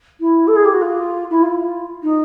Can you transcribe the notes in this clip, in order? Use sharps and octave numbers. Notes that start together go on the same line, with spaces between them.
E4
A4
G#4
G4
F#4
F4
E4
F4
D#4